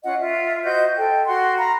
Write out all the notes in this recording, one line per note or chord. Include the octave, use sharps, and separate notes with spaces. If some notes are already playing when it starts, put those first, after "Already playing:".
C#4 F4 D#5 F#5
F4 E5
F#4 C5 D#5 G6
A4 G5
F#4 F#5 C6
F5 A#5 B5